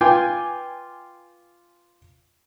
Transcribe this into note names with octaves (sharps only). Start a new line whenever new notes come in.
F4 B4 G5 G#5 D6